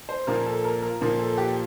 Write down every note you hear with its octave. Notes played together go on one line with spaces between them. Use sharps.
C5
A#2 F3 A#3 A#4
A4
A#4
A#4
A#2 F3 A#3
A4
G4